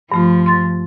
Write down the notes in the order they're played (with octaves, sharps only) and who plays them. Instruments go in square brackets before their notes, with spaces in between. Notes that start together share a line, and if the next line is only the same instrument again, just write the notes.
[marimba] G2 A3 F4 [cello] F3
[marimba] C6 A6